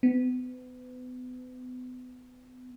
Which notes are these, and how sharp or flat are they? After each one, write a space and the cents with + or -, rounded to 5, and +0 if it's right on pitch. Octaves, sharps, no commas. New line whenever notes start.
B3 +35